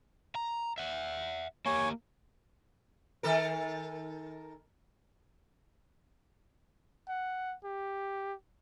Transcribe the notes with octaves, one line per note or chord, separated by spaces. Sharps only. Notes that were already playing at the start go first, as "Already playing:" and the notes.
A#5
E5 F#5
A#3 G4 C#5 G#5
D#3 A4 A#4
F#5
G4